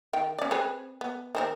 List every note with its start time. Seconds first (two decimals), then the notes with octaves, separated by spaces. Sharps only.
0.13 D#3 G5
0.38 C#4 D5
0.51 C4 G#4 B4
1.01 B3
1.35 D#3 C4 A#4